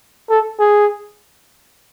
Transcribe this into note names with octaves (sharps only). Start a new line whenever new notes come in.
A4
G#4